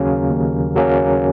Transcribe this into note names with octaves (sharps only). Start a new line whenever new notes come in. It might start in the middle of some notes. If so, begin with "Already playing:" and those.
Already playing: D#2 C#3 F#3 A#3 C#4 A#4
D#2
C#3 F#3 A#3 C#4